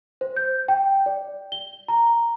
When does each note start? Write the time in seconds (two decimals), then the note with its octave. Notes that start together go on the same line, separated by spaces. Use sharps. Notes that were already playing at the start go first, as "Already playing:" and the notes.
0.21 C5
0.36 G6
0.68 G5
1.06 D5
1.52 G7
1.88 A#5